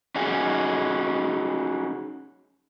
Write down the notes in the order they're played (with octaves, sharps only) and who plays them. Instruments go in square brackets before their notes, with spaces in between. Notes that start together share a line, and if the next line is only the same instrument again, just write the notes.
[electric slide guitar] C#4 D#4 F#4 G#4